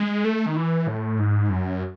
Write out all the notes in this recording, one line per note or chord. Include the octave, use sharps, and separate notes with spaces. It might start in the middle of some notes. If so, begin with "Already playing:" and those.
Already playing: G#3
A3
D#3
E3
A2
G#2
F#2